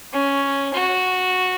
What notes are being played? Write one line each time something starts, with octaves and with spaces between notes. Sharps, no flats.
C#4
F#4